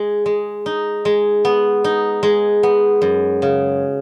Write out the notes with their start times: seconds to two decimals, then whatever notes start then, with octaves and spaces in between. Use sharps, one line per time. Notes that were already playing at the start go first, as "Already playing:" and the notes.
Already playing: G#3
0.26 G#3
0.66 D#4
1.05 G#3
1.45 B3
1.84 D#4
2.23 G#3
2.63 B3
3.02 F#2
3.42 C#3